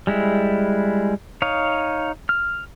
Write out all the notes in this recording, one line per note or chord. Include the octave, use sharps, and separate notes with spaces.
G3 G#3 E4
D#4 C#5 F5
F6